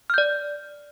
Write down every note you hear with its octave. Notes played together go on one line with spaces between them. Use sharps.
D5 F6 G6